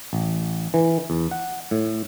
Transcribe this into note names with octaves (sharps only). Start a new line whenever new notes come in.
A1
E3
E2
F#5
A2